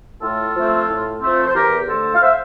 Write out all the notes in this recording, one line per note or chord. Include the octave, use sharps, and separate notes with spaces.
A2 F4 A4
F3 A3 C4
A2
F3 A3 C4
C5
E2 G4 A#4
D3 A3 A4 C5
F5
C5 E5